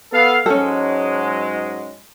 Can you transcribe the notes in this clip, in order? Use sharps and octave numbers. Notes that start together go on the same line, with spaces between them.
B3 A4 F5
G#2 F#3 G#3 C#4 A4